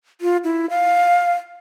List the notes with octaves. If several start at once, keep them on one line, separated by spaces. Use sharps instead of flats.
F4
E4
F5